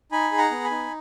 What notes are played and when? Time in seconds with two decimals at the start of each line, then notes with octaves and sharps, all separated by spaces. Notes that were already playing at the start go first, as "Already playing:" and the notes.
0.12 D#4 G#5 B5
0.32 G#4
0.38 F#5 A#5
0.51 B3
0.64 G#5 B5
0.71 D#4